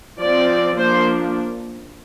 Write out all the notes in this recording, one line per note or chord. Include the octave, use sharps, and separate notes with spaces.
F3 C4 D5
F3 A#3 D4 C5